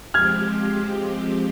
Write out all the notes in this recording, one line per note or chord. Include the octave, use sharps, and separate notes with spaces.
F3 G#3 C4 G4 F6 G#6